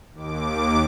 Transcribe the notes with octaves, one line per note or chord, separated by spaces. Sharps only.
D#2 D6